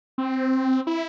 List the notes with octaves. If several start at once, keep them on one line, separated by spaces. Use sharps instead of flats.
C4
E4